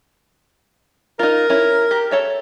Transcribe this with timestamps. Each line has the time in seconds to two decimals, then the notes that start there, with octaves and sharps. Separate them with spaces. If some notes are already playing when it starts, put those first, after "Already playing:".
1.19 D#4 F4 A#4
1.50 C#4 E4
1.91 G4
2.11 A4 C#5 E5